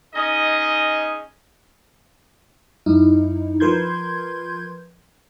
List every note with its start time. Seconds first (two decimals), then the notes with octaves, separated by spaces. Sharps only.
0.15 C#4 D#4 G#4 D#5
2.86 F#2 D#4 E4
3.60 F3 A#4 B4 C6 G6 G#6